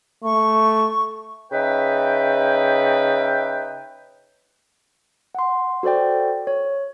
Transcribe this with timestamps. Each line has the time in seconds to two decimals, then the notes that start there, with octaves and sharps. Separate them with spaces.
0.24 A3 C#6
1.52 C#3 D#4 B4 E5 G5
5.35 F#5 C6
5.83 F#4 A4 C5 D5 G5
6.47 C#5